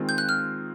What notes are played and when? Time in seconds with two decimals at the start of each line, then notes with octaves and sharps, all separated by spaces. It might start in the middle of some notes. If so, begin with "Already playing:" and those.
Already playing: D#3 G#3 C4 F4
0.09 G6
0.18 F#6
0.29 F6